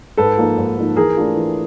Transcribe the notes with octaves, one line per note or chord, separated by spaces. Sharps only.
G#2 A4 B4
F3 A#3 D#4
G#2
F3 A#3 D#4
E3 G#4 A#4
A3 D4 F4
E3